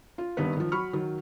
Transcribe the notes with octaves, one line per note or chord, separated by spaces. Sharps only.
F4
G#1 G2 D#3 B3 B4
D#3 F3
F#3 B5 C#6 F6
D#3 F#3